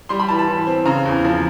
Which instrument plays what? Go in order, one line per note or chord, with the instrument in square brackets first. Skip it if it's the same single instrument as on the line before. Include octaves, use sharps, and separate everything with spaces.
[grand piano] G3 C6
B5
E3 A5
A5
E3
C4
C#3 A#5
E2
F3